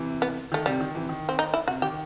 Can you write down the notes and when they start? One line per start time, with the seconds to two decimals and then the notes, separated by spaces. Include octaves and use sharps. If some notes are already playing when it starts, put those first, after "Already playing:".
Already playing: C3 E3
0.22 B3
0.52 D#3 A3
0.66 C3 G3
0.80 D#3
0.95 C3 E3
1.09 D#3
1.29 C4
1.39 D#4
1.54 E4
1.68 C3 F#4
1.82 D#3 G4